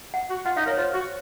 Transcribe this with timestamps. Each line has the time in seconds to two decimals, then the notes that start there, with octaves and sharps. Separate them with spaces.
0.14 F#5
0.30 F#4
0.45 F4 F#5
0.57 D#4 F5
0.66 A#4 C#5
0.77 F4 C5
0.94 F#4